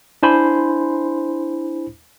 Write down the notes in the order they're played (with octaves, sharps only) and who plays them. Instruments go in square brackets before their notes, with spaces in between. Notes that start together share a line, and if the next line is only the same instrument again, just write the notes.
[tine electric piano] D4 E4 C5 G#5 B5 C6